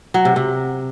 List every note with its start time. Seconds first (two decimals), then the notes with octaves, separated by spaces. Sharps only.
0.14 F#3
0.25 C3
0.36 C3